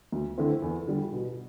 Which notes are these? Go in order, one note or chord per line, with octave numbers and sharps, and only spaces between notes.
D2
D3 A3 C4 E4
E2
D3 G3
B2